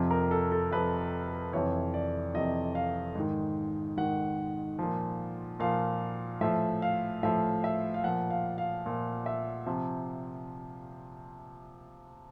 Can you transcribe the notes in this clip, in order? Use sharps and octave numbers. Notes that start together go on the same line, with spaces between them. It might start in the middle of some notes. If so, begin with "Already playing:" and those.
Already playing: F2 C3 F3
A#4
A4
A4
F2 C3 F3 B4
F2 C3 E3 C#5
D5
F2 C3 E3 D#5
F5
G#2 D#3
G#2 D#3 F#5
A#2 F3
A#2 F3 F5
A2 F3 E5
F5
A2 F3 E5
E5
F5
A#2 F3 F#5
F5
F5
A#2 F3
E5
C3 F3